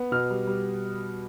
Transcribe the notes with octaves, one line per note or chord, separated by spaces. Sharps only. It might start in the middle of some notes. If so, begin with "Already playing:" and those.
Already playing: B3
B2 F6
G3
G3